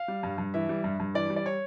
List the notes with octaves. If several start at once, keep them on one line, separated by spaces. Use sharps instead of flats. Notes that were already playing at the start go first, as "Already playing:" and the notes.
Already playing: F5
G3
G2
G2
E3 E5
G3
G2
G2
E3 D5
G3
D5
C#5